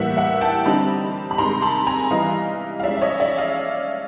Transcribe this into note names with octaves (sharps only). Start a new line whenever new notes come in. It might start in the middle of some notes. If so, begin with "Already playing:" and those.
Already playing: A2 E3 G3 A#3 E5 F#5
E5 F#5
G5 A5
D3 G3 C4 D#4 A5 B5
B5
C3 D#3 G#3 A#5 C6
A5 B5
G#5 A#5
E3 G3 B3 E4 D#5 F5
F5
F3 G#3 C#4 D5 E5
E5
C#5 D#5
D5 E5
D#5 F5